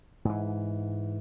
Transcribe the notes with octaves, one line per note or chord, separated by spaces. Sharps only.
G#2 E3